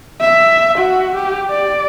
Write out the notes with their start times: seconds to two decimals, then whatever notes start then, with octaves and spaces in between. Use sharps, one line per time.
0.21 E5
0.78 F#4
1.15 G4
1.50 D5